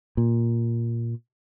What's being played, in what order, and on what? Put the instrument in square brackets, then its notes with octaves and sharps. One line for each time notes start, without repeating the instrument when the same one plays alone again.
[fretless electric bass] A#2